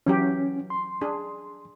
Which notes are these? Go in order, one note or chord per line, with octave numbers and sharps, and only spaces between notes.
E3 F#3 C#4 G4
C6
D4 G#4